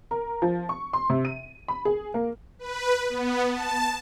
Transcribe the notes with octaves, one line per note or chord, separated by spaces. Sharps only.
A#4
F3
C#6
C6
C3
D#7
B5
G#4
A#3
B4
B3
A5